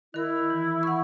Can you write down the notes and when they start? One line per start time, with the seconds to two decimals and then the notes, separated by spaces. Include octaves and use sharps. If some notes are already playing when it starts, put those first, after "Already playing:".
0.14 D#3 E4 A#4
0.50 E3
0.83 F#5 C#6